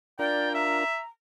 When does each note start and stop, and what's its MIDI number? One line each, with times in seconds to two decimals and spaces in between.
0.19 0.84 62
0.19 0.84 65
0.19 0.84 70
0.19 0.49 74
0.19 0.51 79
0.54 0.98 76
0.54 1.07 82